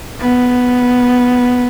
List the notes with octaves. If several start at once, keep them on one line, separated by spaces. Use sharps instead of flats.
B3